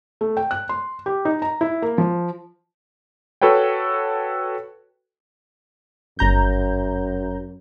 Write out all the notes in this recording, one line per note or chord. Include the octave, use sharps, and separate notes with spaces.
A3
G5
F#6
C6
G4
D#4
A#5
E4
A#3
F3
F#4 A4 B4 C#5 G5
G1 F#2 A#5 G6